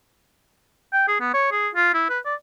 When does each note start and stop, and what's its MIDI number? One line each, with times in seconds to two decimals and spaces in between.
0.93 1.04 79
1.08 1.18 68
1.20 1.32 59
1.34 1.48 73
1.51 1.69 68
1.75 1.91 65
1.94 2.05 64
2.10 2.19 71
2.25 2.35 74